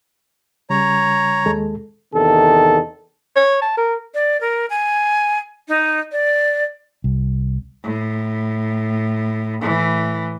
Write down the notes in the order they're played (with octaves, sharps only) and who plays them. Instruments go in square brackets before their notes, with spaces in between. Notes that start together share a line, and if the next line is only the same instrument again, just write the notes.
[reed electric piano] C#3 G3 [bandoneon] C#5 A#5
[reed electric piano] D#2 G#3 A4
[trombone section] E2 C3 D#3 A4
[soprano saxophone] C#5
A5
A#4
[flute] D5
A#4
G#5
D#4
D5
[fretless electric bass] C2
[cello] A2
A2 E3